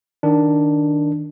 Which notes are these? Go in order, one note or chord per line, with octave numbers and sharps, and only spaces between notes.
D#3 D4